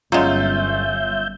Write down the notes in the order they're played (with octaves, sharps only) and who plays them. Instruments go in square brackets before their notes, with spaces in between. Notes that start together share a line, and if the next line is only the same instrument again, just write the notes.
[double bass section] G1 [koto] F#3 G#3 [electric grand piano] C#4 F4 [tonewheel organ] E5 G6